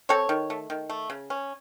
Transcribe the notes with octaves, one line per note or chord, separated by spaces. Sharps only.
C4 A4 C#5
D#3
A3
D#3
A3
C#3
C#4